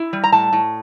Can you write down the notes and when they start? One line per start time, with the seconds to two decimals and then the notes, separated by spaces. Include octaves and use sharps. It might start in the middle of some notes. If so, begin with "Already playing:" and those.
Already playing: E4
0.13 G3
0.24 A#5
0.32 A2 A5
0.53 A2